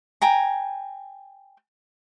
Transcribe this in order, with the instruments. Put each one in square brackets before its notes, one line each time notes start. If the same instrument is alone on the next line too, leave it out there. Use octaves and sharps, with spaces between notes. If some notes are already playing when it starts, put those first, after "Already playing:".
[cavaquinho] G5 G#5 A#5